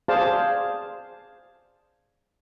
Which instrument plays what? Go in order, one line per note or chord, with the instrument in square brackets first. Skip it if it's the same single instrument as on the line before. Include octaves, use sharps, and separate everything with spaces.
[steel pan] G#4 C5 D5 F5 A5